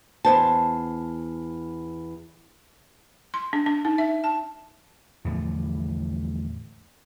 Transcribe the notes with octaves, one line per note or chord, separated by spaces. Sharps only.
E2 C5 A5
C6
D4
D4
D#4
E5
A5
E2 A2 D3 F3